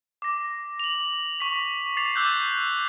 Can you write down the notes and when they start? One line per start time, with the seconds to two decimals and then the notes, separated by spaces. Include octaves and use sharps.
0.22 D6 A#6
0.79 F7 F#7
1.40 C#6 B6
1.97 D6 A6 C7 F7
2.15 D6 E6 F#6 G6